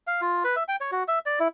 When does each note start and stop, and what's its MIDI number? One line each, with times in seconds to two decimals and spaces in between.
0.07 0.21 77
0.21 0.44 65
0.44 0.56 71
0.56 0.64 76
0.68 0.76 79
0.81 0.91 73
0.92 1.03 66
1.08 1.19 76
1.26 1.39 74
1.40 1.48 64